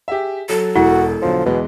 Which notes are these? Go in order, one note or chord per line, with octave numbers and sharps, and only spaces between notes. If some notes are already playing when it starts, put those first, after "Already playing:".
G4 G#4 E5
F#3 A4
E1 E4 F#4
B1 D3 F3 F#3
E2 B2 E3 G#3